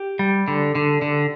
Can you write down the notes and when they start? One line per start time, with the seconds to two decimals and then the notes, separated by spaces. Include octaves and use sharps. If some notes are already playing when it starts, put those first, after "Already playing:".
Already playing: G4
0.19 G3
0.48 D3
0.75 D3
1.02 D3